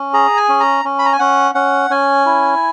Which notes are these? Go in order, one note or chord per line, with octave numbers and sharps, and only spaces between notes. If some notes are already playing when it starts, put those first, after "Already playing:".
Already playing: C#4
G#4 A#5
G#5
C#4
A#5
C#4
B5
A#5
G#5
C#4 F#5
C#4 F#5
C#4 G#5
E4